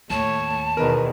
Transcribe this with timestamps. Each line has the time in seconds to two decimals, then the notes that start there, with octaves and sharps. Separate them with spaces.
0.10 D#2 A2 C#5 A5
0.77 E2 B2 D#3 A#4 B4